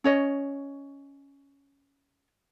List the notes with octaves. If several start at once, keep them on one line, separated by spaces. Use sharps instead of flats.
C#4 C#5 D#5